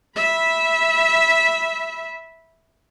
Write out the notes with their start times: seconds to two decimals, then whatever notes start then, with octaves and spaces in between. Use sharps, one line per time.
0.16 E5 B5